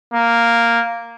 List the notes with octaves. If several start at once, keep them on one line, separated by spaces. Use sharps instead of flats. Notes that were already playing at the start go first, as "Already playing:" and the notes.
A#3